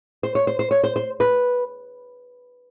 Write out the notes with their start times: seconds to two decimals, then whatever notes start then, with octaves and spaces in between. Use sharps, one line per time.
0.23 C5
0.35 C#5
0.47 C5
0.59 C5
0.71 C#5
0.84 C5
0.96 C5
1.20 B4